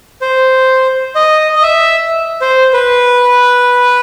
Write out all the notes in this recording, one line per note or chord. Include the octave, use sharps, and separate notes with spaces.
C5
D#5
D#5
E5
C5
B4